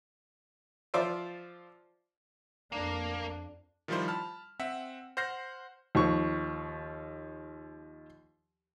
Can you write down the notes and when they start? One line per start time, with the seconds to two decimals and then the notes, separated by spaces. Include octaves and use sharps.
0.94 F3 F4 C5 D5 E5
2.72 F2 A#3 D4
3.88 D#3 F3 G3 E4 F4 C5
4.08 A5 B5 F6
4.59 C4 E5 F#5
5.17 C5 F#5 F6 G6 A#6 C7
5.95 D#2 F3 C#6